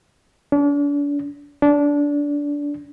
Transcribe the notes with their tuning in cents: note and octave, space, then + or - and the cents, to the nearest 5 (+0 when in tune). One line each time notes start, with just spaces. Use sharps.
D4 -40
D4 -20